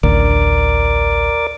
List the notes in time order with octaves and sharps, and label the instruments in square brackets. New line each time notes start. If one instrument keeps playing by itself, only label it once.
[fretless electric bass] A1 D2 [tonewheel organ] A#4 D5 D6